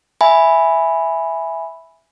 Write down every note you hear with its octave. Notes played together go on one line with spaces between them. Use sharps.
E5 G#5 B5